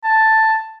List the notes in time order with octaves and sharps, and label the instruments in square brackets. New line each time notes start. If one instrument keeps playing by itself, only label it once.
[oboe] A5